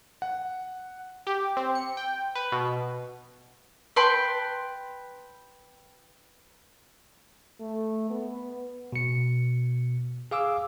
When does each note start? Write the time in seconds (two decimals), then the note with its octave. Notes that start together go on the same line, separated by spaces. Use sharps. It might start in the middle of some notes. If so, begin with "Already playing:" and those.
0.22 F#5
1.27 G4
1.57 C4
1.75 C#7
1.97 G5
2.35 B4
2.52 B2
3.96 B4 G5 A5 C6
7.60 A3
8.10 B3
8.93 B2 C#7
10.31 G#4 F5 D6 E6